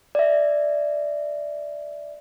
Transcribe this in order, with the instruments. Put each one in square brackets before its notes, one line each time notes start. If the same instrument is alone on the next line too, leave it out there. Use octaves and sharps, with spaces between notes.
[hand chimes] D5 E5